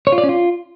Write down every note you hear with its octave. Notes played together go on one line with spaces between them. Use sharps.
C#5
F4
D5
C#4
F4